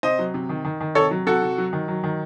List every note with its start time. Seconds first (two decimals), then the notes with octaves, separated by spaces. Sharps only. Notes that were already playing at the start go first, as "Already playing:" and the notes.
0.03 C3 C5 D#5
0.19 F#3
0.34 C3
0.49 D#3
0.64 D#3
0.81 D#3
0.95 C3 A4 C#5
1.11 F#3
1.26 C3 F#4 A4
1.43 C3
1.58 F#3
1.73 D#3
1.88 F#3
2.04 D#3